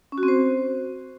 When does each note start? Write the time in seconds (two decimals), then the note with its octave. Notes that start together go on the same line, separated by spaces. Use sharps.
0.12 C#4
0.18 F#4
0.23 C4
0.28 C5